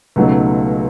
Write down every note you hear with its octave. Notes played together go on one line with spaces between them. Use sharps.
C#2 B2 F#3 A3 D#4